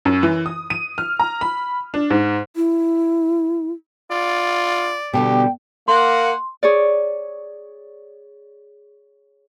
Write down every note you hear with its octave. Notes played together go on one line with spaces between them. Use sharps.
F#2
E3
D#6
D#7
F6
A#5
B5
D4
G#2
E4
F4 D5
B2 D3 G3 G4 G5
A#3 F#5 C6
G#4 C#5 D5